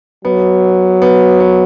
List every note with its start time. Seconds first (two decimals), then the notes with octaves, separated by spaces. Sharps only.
0.25 F#3 B3
1.02 B3
1.40 B3